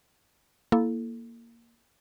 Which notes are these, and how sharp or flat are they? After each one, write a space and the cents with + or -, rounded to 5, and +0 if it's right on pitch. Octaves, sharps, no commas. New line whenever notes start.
A#3 +0 E4 +5 A4 -5